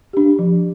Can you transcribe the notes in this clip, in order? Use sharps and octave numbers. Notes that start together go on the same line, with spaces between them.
D4 G4
F3